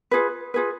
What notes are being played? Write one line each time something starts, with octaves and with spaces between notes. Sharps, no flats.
F4 G#4 B4
F4 G#4 B4